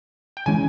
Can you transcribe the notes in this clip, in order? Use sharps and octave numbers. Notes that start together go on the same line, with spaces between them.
G5
C#3 E3 G#3 C#4 G#5